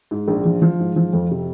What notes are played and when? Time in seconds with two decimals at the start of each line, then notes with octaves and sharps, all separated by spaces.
0.11 G#2
0.28 A#1
0.45 F3
0.62 F3
0.80 G#2
0.96 F3
1.13 F2
1.31 C3